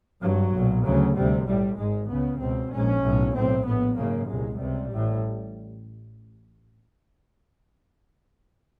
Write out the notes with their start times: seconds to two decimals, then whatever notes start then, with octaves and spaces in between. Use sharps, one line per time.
0.21 G#1 G2 F#3
0.52 B1 A#2
0.83 D2 C#3 F#3
1.15 D2 C3 G3
1.46 B1 A2 G3
1.77 G#1 G#2 G#3
2.08 C#2 C#3 B3
2.40 C#2 B2 C4
2.71 A#1 G#2 C#4
3.03 B1 A2
3.34 B1 A2 C4
3.65 A#1 A2 B3
3.97 G#1 F#2 C#3 A#3
4.28 C2 A#2 G#3
4.59 C#2 C3 G3
4.91 A1 A2